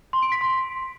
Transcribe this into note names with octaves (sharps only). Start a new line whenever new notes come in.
C6
D7
B6
C6